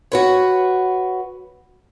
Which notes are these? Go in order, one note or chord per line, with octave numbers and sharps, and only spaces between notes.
F#4 B4 C#5